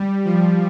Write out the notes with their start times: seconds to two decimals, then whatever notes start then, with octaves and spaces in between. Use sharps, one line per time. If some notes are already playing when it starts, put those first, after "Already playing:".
Already playing: G3
0.25 F3